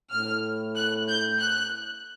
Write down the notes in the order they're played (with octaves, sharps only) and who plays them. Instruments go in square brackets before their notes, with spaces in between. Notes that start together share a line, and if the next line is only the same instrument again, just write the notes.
[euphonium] A2 [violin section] F6
[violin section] F#6
G6
F#6